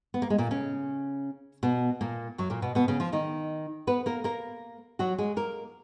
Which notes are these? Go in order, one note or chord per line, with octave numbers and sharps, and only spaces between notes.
B3
A#3
G#3
A#2 A#3
C#3 C#4
B2 B3
A#2 A#3
F#2 F#3
A#2 A#3
B2 B3
B2 B3
C#3 C#4
F3 F4
D#3 D#4
B3 B4
A#3 A#4
A#3 A#4
F#3 F#4
G#3 G#4
A#3 A#4